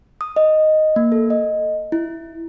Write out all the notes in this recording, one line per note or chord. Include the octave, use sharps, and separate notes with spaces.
D#6
D#5
A#3
A4
D#5
E4